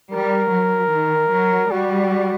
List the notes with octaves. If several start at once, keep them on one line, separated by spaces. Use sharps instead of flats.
G3 A#4
F#3
D#3
F#3
G3 F#4